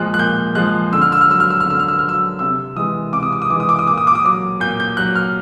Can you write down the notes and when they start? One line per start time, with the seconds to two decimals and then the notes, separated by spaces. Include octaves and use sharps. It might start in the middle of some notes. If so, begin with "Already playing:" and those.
Already playing: A#2 F3 G#3 F#6
0.14 F#6
0.19 A#2 G6
0.55 F3 G#3 F#6
0.92 D3 E6
1.02 F6
1.12 E6
1.21 F6
1.29 F#3 E6
1.40 F6
1.50 E6
1.60 F6
1.66 D3 E6
1.79 F6
1.88 E6
1.99 F#3 F6
2.09 E6
2.39 C3 E6
2.76 E3 G#3 D#6
3.13 C3 D6
3.23 D#6
3.32 D6
3.42 D#6
3.50 E3 D6
3.55 G#3
3.60 D#6
3.69 D6
3.79 D#6
3.87 A#2 D6
3.98 D#6
4.07 D6
4.15 D#6
4.24 F#3 D6
4.60 A#2 G6
4.80 G6
4.97 F#3 F#6
5.15 F6